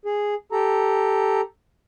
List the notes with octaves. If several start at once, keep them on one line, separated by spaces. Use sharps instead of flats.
G#4
G4 A4 A#5